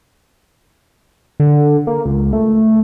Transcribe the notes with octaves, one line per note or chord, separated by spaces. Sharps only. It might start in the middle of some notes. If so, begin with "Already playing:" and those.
D3
A#3
C#2
A3